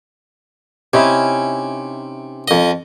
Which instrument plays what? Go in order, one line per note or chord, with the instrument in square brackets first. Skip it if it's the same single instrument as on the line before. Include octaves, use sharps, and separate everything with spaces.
[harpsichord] C3 [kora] C#4 D#4 E4
[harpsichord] F2 D#5